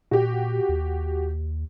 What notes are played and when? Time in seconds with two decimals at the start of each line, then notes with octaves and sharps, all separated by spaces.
0.11 A#2 F#4 G4
0.69 D#2